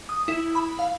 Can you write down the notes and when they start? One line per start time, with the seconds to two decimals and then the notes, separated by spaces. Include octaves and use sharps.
0.09 D#6
0.28 E4
0.55 B5
0.79 F5